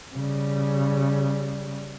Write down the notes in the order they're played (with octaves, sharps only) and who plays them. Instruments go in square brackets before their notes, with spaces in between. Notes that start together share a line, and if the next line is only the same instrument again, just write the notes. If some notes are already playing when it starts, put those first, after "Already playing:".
[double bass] C#3 G3